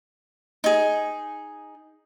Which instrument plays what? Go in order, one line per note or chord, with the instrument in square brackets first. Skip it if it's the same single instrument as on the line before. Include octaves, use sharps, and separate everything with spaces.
[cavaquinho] D#4 G#4